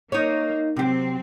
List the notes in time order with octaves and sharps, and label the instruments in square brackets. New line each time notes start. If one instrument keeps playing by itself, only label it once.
[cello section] A#3 [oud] D#4 C#5
[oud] C3 G4 [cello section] F#3 C4